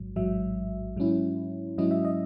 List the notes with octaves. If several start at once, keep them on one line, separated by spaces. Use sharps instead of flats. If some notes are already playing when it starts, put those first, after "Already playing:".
Already playing: A1 G#2 F#3
A1 G#2 F#3 E5
G#2 F#3 C#4 E4
G#2 F#3 C#4 E4 D#5
E5
D#5